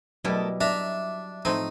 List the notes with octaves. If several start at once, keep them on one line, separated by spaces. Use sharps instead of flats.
B2 F#3 G3 A3 E4 A4 A#4 D#5
D4 E5 A#5
A2 F3 A3 C4 D#4 D#5